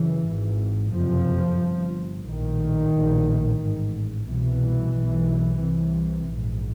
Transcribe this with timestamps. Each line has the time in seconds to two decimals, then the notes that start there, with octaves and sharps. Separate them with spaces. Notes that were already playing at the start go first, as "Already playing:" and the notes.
Already playing: F#2 C#3 E3
0.26 G#1 G#2
0.92 F#1 F2 C3 F3
1.60 G1 G2
2.26 A#1 A2 D#3
2.94 A#1 A2
3.61 A1 G#2
4.28 C2 B2 E3
4.94 B1 B2
5.61 C2 C3
6.28 A#1 G#2